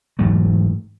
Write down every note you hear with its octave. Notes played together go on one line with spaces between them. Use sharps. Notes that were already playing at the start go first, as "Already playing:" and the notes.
G#2 E3 F#3 A3